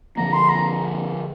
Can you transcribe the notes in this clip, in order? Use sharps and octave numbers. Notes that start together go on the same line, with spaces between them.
D3 F3 A#3 A#5
C6
A#5